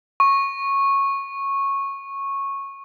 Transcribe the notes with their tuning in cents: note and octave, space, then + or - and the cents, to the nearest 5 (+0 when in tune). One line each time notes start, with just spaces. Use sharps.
C#6 -10